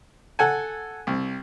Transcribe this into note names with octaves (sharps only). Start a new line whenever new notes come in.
A4 F#5 G#5
C2